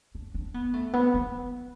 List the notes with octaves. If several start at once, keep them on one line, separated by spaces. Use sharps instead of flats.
D4
D4
B3
A3
B3
B3